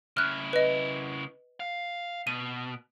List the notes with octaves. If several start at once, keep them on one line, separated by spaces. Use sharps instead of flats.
C#3 E4 F6 F#6
B4 D#5
F5
B2 D#7